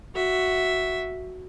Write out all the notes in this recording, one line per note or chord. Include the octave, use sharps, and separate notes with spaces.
F#4 E5